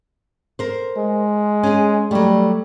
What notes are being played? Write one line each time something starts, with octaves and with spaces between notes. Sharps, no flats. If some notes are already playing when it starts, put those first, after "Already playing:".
A#4 C5
G#3
C#4 G#4
F#3 G3 A3